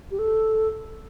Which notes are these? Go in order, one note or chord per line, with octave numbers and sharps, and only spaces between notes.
G4
A4